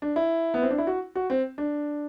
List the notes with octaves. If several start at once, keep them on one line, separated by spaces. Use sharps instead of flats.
D4
E4
B3
C4
D4
E4
F#4
F#4
C4
D4